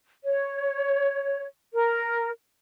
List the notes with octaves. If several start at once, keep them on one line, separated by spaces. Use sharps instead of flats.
C#5
A#4